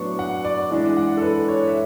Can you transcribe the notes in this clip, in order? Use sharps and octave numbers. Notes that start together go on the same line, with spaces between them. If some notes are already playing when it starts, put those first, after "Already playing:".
Already playing: A2 F#3 B3 D4 C#6
F#5
D5
E3 G#3 D4 D5
F#5
A4
B4
C#5
E5